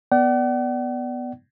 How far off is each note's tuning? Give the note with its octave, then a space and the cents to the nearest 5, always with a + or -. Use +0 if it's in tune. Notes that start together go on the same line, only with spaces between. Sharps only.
B3 +0 D5 +0 F#5 +45